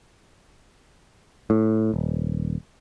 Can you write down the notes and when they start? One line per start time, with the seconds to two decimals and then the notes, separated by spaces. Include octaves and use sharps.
1.50 A2
1.94 D#1